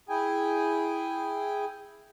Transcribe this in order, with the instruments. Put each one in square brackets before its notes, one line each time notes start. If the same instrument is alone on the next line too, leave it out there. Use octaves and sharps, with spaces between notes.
[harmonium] E4 G#4 G5 G#5